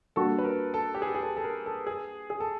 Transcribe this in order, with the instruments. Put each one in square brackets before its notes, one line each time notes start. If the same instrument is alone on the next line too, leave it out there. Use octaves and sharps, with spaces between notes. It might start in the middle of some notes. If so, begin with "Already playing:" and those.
[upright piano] G3 A#3 D4 F#4 [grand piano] A4
[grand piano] B4
A#4
A4
G4
G#4
G#4
A4
A4
A#4
A4
G#4
G#4
A4